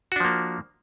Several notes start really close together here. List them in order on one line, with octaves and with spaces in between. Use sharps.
F#4 D4 F3 A#3